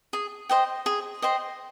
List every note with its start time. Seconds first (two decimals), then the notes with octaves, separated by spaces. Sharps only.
0.13 G#4
0.49 C5 D#5 G5
0.86 G#4
1.22 C5 D#5 G5